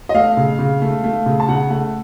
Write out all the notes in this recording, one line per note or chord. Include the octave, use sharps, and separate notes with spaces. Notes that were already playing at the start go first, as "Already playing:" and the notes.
D#5
A3 F5
C#3
C#3
A3
A3
C#3
A5
C#3 F#5
A3 F#5